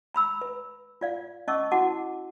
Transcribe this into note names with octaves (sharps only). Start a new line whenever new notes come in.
A#5 B5 E6
B4
F4 D5 F5
C#4 D#5 A5 C#6 D6 E6
E4 F#4 F#5 A5 D6